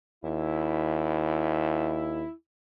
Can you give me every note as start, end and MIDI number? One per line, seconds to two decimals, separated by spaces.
0.24 2.25 39
0.24 2.31 64